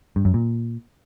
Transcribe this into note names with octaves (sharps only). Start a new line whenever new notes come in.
G2
F#2
A#2